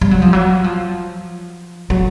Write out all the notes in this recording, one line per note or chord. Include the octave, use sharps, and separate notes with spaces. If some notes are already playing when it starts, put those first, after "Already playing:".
G3
F#3
F3
F#3
F3
F#3